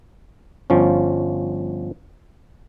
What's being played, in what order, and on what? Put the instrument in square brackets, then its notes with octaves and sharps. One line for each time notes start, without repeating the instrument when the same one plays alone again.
[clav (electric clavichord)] G1 F3 C#4